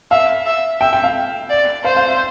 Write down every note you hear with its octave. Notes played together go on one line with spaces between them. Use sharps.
E5 F5
E5
E5 G5
G5
F5
D5
C5 F5
F5
E5